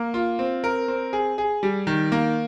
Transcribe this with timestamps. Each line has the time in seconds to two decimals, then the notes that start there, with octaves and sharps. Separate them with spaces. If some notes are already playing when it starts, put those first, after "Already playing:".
Already playing: A#3
0.14 F4
0.39 C4
0.64 A#4
0.88 C4
1.13 G#4
1.38 G#4
1.63 G3
1.87 D#3
2.12 A#3